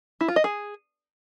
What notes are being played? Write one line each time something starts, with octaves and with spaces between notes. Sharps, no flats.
E4
F4
D#5
G#4